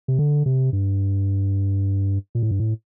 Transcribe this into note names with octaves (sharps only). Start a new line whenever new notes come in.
C3
D3
C3
G2
A#2
A2
G2
A2